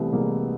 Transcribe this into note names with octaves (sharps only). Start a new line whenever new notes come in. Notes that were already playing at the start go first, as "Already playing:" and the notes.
Already playing: C2 C3 E3 A3 B3
C2 G#3 A#3